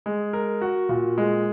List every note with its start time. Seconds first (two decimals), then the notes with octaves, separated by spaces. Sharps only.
0.06 G#3
0.33 A#4
0.61 F#4
0.89 A#2
1.18 G#3